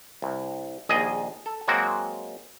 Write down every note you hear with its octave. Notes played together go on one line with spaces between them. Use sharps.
C2
A#1 D#2 G#4 D#5
A4
F#3 G#3 A#3 C4 F#4